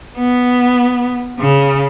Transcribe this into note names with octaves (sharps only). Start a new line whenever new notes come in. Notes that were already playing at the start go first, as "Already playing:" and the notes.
B3
C#3